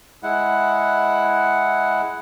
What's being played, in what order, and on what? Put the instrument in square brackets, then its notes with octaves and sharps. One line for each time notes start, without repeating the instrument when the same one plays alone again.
[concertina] G#3 E4 F#5